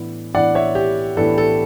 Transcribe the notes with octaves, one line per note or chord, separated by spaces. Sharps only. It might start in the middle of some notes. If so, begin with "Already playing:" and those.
Already playing: A2 E3 B3 D4
A2 E3 B3 D4 D5 F#5
C#5 E5
G4
A2 E3 B3 D4 A4
A4